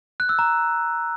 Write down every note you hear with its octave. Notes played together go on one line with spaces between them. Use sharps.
F#6
E6
A#5